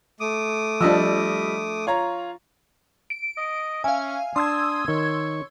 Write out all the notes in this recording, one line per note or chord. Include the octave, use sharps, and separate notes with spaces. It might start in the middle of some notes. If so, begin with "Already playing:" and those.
A3 D6 D#6
F3 G3 D4 D#5 E6
F4 C#5 A#5
D7
D#5
C#4 E5 F5 G#5
D4 A5 C6 D#6 E6 G#6
D#3 C#5